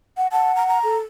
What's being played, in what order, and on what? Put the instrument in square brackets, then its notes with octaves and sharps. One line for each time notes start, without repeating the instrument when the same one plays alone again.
[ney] F#5
[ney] F#5 [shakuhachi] A5
[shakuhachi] A#5
A#5
[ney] A4